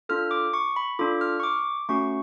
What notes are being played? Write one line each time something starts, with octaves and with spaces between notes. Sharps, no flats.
D4 F4 A4 F6
D6
C#6
B5
D4 F4 A4 D6
F6
C#6
D6
A3 C#4 F#4 C#6